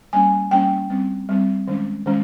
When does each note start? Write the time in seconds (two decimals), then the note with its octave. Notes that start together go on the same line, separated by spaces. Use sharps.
0.13 G3 A#3 C#4 G#5
0.51 G3 A#3 C#4 G5
0.90 G3 C4
1.29 G3 C4
1.68 D#3 G#3 C#4
2.06 D#3 G#3 C#4